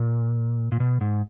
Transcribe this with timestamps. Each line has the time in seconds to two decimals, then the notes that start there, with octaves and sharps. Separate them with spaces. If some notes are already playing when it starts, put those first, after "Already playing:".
Already playing: A#2
0.72 A#2
0.80 B2
1.01 G#2